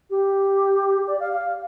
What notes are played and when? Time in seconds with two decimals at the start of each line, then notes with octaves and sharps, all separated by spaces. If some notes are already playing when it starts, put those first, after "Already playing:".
0.10 G4
1.07 D5
1.20 F5
1.33 F5